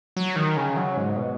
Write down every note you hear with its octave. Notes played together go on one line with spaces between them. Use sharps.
F#3
D#3
C#3
F#3
G#2
B2